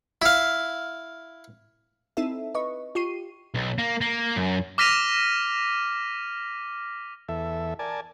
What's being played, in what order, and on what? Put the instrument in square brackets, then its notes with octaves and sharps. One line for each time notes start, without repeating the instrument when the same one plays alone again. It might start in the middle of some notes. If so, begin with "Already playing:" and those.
[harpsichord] E4 F5
[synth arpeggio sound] C4 D#4 E4 A4 E5
B4 D#5 C#6
F4 G4 C#6 C7 D#7
[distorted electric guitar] B1
A#3
A#3
F#2
[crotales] D6 F6 A#6 B6 D#7 F7
[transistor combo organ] E2 A4 E5
A#4 D5 G#5 A5